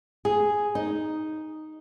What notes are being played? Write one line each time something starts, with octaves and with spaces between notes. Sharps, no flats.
G#4
D#4